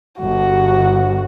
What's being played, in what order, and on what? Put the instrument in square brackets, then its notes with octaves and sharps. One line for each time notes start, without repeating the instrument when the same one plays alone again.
[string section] G1 [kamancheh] F#4